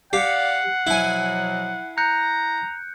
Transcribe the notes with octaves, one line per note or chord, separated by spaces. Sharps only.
G4 D5 F5 F#5 C7 C#7
B2 F3 F#3 E4 G#5
A#5 F#6 G6 C#7